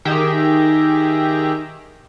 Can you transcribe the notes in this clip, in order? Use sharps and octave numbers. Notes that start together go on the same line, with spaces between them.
D#3 G4 G#4 E5 G5 A#5